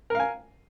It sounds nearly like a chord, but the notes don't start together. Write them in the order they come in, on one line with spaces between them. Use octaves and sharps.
A#4 F5 G#5